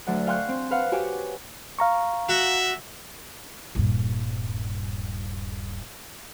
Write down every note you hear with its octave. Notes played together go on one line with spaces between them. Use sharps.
D2 F#3 D5 F#5
F5 G5 G#5 C6 C#6 F#6
C4
B4 F5 F#5
F#4 G4 C#5 G#5 D6
F5 A#5 C#6
F#4 E5
D#1 G2